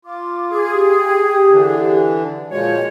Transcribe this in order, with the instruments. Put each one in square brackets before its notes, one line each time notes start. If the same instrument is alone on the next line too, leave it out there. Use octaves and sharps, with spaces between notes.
[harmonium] F4 [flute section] D6
[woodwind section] G#4
[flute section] G4
[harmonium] D3 E3 D4
[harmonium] A#2 F3 G#3 [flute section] F#4 [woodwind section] C#5